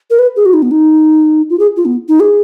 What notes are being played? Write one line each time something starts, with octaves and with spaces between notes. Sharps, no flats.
A#4
B4
G#4
F#4
D#4
B3
D#4
F4
G#4
F4
B3
D#4
G#4